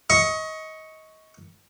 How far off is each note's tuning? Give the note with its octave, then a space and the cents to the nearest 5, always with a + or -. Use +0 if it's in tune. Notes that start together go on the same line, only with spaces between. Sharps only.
D#5 +25 C#6 +0